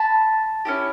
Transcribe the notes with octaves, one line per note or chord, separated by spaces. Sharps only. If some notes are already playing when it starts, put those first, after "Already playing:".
Already playing: A5 B5
C#4 E4 G4